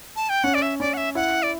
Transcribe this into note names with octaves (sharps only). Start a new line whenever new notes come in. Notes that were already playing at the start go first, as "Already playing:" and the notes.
A5
G5
C#4 F#5
D5
E5
C#4 D5
F#5
E5
E4 F#5
D5